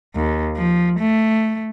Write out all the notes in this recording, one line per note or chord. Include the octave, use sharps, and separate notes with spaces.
D#2
F3
A3